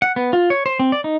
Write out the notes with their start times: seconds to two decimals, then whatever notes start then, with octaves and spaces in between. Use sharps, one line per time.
0.02 F#5
0.16 B3
0.33 F4
0.50 C#5
0.66 C5
0.80 C4
0.92 D5
1.04 D#4